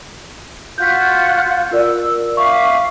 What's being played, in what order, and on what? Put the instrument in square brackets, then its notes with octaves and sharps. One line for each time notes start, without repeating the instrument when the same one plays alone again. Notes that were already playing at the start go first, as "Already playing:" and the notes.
[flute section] F4 F#4 F#6 [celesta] G6 B6
[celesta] F4 A#4 D5 [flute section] E6
[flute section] E5 F5 D6 [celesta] C#6